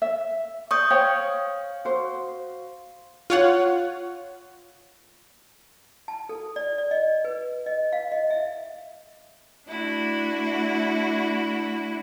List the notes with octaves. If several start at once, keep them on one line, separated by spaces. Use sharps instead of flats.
E5
D5 C#6 D#6 G6
C5 C#5 F5 G5
F#4 C5
F4 C#5 F#5
A5
A4
D5
D5
D#5
B4
D#5
F5
D#5
E5
A3 D4 E4 F#4